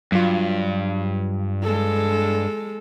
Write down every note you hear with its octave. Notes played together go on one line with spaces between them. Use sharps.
G2 F#3 F4
G#3 A4